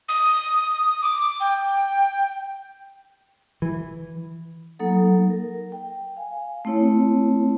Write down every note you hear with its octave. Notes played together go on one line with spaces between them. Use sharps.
D#6
D6
G5
E3
F#3 A#3 D#4 A4 F#5
A#4
G5
F5 G#5
A3 C4 E4 C#5